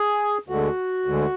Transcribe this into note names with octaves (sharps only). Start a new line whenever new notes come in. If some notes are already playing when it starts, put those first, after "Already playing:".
Already playing: G#4
D2 D3 G#3 F#4
D2 D3 G#3